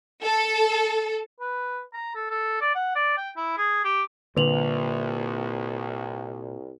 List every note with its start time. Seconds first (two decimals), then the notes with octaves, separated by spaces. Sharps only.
0.22 A4
1.41 B4
1.94 A#5
2.15 A4
2.31 A4
2.61 D5
2.75 F#5
2.96 D5
3.18 G5
3.37 E4
3.58 G#4
3.85 G4
4.36 C2 A#2 D3 B4 F7 F#7